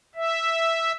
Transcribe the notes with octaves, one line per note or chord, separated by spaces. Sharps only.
E5